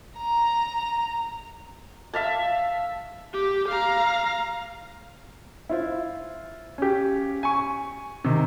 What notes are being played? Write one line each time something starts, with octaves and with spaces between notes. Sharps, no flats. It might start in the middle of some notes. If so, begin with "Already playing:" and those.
A#5
E5 F5 A5
G4
F5 A#5
E4 F4 C5
C#4 G4
G#5 C#6
C3 D#3